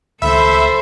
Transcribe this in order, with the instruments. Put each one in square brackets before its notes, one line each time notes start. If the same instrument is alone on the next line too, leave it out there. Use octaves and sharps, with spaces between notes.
[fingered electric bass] C#2 D#3 A3 [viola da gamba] A4 C5 [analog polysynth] E5 [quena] B5